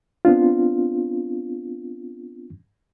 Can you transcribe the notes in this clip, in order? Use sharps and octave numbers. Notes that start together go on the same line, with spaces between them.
B3 C4 D4 F4